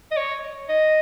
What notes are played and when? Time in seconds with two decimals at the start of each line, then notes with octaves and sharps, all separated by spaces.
0.12 D#5
0.17 C#5
0.69 D#5